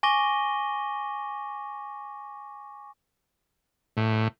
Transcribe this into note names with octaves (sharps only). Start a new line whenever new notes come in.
G#5 C#6 D6 A#6 D#7 G7
A2